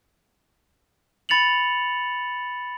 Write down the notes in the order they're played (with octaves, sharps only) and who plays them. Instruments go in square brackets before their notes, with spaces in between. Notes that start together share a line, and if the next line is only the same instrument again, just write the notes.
[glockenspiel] B5 A6 C#7 F7 F#7